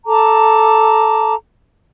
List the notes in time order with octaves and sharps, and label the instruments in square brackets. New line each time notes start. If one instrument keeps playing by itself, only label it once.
[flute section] A4 A5 A#5 D6